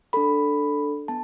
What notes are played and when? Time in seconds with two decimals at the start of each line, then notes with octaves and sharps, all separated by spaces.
0.13 D4 A4 B5
1.08 B3 A5